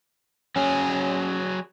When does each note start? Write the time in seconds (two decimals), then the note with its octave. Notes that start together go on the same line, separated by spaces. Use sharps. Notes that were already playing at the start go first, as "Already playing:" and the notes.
0.56 F#3 C#4 G#4